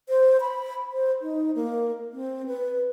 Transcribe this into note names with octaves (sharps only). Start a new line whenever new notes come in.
C5
B5
C5
D#4
A#3
C4
B4